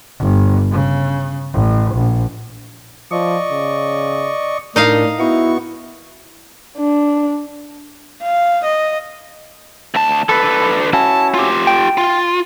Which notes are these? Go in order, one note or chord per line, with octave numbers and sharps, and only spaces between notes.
G1
C#3
A1
A#1
F3 D5 D#5 C#6
C#3
A2 D4 D#4 A#4 D#5 F5
B3 E4 F#4 C#6
D4
F5
D#5
D2 A5
D3 A4 B4
C#4 E4 F#4 A5
F4 G4
G5
F4